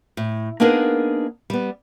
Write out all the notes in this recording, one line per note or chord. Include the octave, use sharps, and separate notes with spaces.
A2
A#3 B3 D4 D#4 G#4 A#4
G3 B3